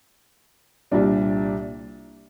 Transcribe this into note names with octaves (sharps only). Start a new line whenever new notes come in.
C2 A#2 G3 D4